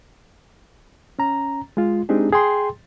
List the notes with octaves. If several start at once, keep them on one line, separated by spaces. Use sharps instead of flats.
C#4 A#5
G#3 F4
G#3 C4 D4 D#4 G4 G#4
G#4 G5 C6